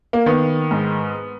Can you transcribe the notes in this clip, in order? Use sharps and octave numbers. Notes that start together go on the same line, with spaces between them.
A#3
D#3 B3
G#2